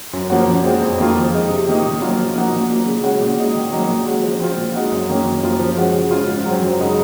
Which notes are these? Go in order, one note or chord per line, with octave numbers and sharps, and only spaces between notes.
F#2
F3 A#3 C#4 F#4
A#2
G#3 C4 D#4 F#4
F2
D#3 A#3 F4
F3
G#3 D#4
C3
D#3 A#3 D#4
A#2
F#3 A#3 F4
F3
A#3 D#4 F#4
A#2
F#3 A#3
C#3
G#3 C#4 F#4
A#2
G#3 D#4 F#4
D#3
F#3 A#3 D#4
A#2
G#3 C#4 F#4
F3
C4 F4
A#2
G#3 D#4 F#4
F#2
D#3 A#3 C#4
F#2
F3 A#3 F4
F3
G#3 C#4 F#4
C#3
G#3 C#4 F4
G#2
F#3 C4
F#2
C#3 G#3 D#4 F#4